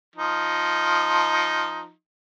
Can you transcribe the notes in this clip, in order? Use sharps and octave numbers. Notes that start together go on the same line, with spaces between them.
F3 D#4